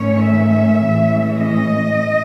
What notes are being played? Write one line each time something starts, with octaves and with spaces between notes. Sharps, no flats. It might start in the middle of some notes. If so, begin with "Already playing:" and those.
Already playing: G#2 D#3 A3 C#4 C#5
E5
A2 E3 G#3 C#4
D#5